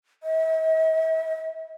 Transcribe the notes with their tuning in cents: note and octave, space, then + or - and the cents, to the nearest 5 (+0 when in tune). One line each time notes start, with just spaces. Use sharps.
E5 -45